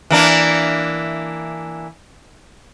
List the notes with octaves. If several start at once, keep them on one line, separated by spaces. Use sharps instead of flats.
E3 A#3 D4